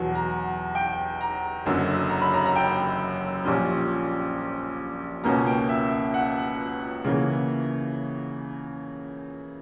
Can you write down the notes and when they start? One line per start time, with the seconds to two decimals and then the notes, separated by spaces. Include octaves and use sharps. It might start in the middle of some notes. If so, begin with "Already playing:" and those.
Already playing: E2 B2 F#3
0.15 A#5
0.75 G5
1.21 A#5
1.66 F#1 F#2 D3 F#3
2.09 A#5
2.22 B5
2.33 A#5
2.46 A#5
2.56 G5
3.45 A#1 A#2 G3 C#4
5.24 C#2 B2 A#3 C#4 A#5
5.47 G5
5.69 E5
6.14 F#5
7.05 C#3 E3 A#3